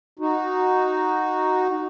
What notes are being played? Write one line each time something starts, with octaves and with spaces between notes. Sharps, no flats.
D#4 F#4